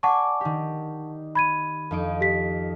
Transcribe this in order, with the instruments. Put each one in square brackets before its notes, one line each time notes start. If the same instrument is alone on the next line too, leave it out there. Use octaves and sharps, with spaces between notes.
[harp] D5 G#5 [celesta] F#5 A5 C#6
[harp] D#3 G4
[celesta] B5 G#6 D#7
[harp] F2 D#4 D7
[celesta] G4 B6